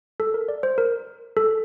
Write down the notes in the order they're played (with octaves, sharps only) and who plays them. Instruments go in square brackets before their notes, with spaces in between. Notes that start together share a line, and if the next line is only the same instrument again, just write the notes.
[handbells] A4
A#4
D5
C5
A#4
A4